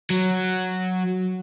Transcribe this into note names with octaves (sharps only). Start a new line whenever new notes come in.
F#3